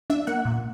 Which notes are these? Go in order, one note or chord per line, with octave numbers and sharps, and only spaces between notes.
D4 E5
A#3 F#5
A#2